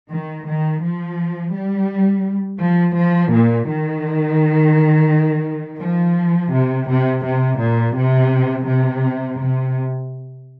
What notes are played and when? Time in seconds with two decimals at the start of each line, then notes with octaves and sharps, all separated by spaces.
0.10 D#3
0.46 D#3
0.82 F3
1.53 G3
2.61 F3
2.96 F3
3.32 A#2
3.68 D#3
5.81 F3
6.53 C3
6.89 C3
7.25 C3
7.60 A#2
7.96 C3
8.67 C3
9.39 C3